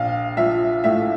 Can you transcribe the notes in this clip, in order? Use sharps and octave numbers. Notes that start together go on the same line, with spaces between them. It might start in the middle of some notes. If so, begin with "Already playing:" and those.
Already playing: A#1 F5
F3 E5
A2 E5